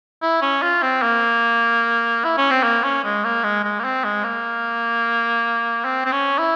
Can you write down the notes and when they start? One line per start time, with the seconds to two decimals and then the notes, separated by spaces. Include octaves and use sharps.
0.22 E4
0.42 C#4
0.62 F4
0.83 C4
1.02 A#3
2.25 E4
2.38 C#4
2.51 C4
2.63 A#3
2.84 C#4
3.04 G#3
3.24 A#3
3.44 G#3
3.64 G#3
3.80 A#3
3.85 C4
4.04 G#3
4.24 A#3
5.85 C4
6.05 C4
6.12 C#4
6.39 E4